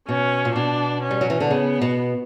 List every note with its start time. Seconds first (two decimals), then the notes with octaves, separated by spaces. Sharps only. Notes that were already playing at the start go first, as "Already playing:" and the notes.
0.08 B2 C#4
0.45 A#2
0.55 B2 D4
1.03 C#4
1.11 G3
1.21 F#3
1.30 E3
1.40 D3
1.51 C#3 B3
1.82 B2